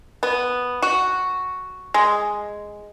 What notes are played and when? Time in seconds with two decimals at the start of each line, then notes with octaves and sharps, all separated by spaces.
0.23 B3
0.82 F#4
1.94 G#3